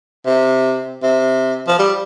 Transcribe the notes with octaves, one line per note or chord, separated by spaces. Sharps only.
C3
C3
F3
G3